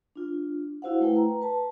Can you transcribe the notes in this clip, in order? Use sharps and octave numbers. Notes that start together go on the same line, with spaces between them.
D4 F4
E4 F#4 C5 F5 F#5
A3 E4 B4 G5
B4 A#5
B4 A5